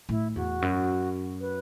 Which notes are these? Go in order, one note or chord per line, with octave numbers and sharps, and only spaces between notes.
A2 E4
E2 F#4
F#2
B4